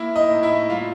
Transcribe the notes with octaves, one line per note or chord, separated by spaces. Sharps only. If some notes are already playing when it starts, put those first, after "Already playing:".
Already playing: A#3 E4 E5
D#4 D#5
A2
E4 E5
G3 F4 F5